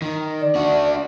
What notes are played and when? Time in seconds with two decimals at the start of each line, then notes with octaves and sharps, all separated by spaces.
0.02 D#3
0.41 D5
0.55 D4 F#4